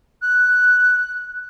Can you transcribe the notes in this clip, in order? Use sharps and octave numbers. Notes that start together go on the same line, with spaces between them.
F#6